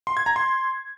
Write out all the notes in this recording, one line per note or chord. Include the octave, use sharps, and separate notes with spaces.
C6
G#6
A#5
C6